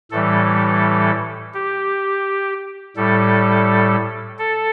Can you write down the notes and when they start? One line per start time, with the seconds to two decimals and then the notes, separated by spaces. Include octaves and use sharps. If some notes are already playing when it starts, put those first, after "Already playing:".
0.11 A2 E3 G3 A4
1.54 G4
2.96 A2 G3 A4
4.39 A4